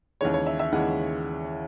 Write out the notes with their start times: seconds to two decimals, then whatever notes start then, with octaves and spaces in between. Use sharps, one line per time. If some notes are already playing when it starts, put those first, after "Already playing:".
0.21 D#2 C#3 E3 G#3 C#5
0.34 C#5
0.46 E5
0.59 E5
0.72 D#2 C#3 E3 G#3 F#5